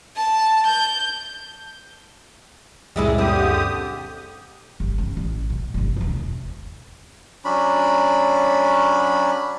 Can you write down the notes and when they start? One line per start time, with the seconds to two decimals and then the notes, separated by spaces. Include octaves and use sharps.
0.17 A5
0.67 G6
2.96 C#2 F#2 A#2 G3 G#3 E4
3.18 D3 C4 G4 D#6
4.80 G1
4.98 C#3
5.17 A1
5.50 B2
5.74 G1 D4
5.96 E1 C2
7.45 F#3 C#4 D4 B5